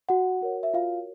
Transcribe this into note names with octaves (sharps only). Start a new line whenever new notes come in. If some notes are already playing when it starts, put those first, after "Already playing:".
F#4 F#5
F#4 A#4 C#5
E5
F4 F5